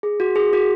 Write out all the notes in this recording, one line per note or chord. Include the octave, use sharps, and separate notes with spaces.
G#4
F#4
G#4
F#4